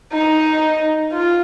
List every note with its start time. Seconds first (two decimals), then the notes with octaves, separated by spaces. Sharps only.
0.12 D#4
1.13 F4